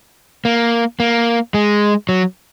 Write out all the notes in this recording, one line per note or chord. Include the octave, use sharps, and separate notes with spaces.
A#3
A#3
G#3
F#3